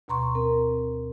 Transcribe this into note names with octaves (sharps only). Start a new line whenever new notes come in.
D2 B2 A#5 C6 C#6
C4 A#4